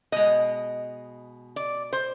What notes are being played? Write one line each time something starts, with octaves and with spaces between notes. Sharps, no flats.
B2 G#3 D#5
D5
C5